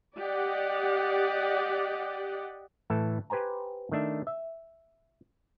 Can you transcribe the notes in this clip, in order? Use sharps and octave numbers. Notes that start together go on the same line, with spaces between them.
G4 D5 D#5 F#5
A2 E3 A4 A5
G4 B4 C5 G#5 A#5
D#3 A3 D4 E5
E5